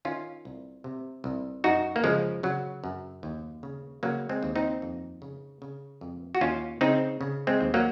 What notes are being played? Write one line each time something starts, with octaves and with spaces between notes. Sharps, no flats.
D#3 C#4 F4
C2
C3
C2
F#2 D#4 F#4
A#3
C#3 F3 G#3
C#3 F#3
F#2
D#2
C#3
C#3 F#3 A#3
G#3 C4
D#2
C4 D#4
F2
C#3
C#3
F2
F#4
D#2 C#4 F4
C#3 C4 D#4
C#3
G#3 C4
D#2
F#3 A#3